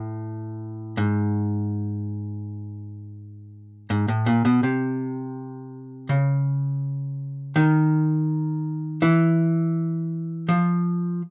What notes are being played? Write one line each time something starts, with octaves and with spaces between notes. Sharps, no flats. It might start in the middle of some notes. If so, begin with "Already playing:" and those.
Already playing: A2
G#2
G#2
A2
A#2
B2
C3
C#3
D#3
E3
F3